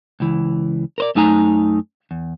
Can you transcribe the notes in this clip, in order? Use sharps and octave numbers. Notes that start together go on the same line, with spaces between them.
C#2 E3
A#4 C5 D5
F#2 A3 D#4 G#5 A#5
E2